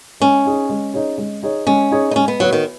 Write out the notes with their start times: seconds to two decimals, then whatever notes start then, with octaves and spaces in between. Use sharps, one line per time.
0.20 G#3 C#4
0.45 D#4 G#4 C#5
0.69 G#3
0.94 D#4 G#4 C#5
1.18 G#3
1.43 D#4 G#4 C#5
1.67 G#3 C#4
1.91 D#4 G#4 C#5
2.11 D#4
2.16 G#3 C#4
2.28 B3
2.40 F#3 B3 F#4 C#5
2.53 D#3